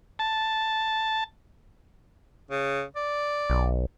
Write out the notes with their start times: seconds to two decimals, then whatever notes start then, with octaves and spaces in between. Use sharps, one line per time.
0.19 A5
2.51 C#3
2.96 D5
3.50 B1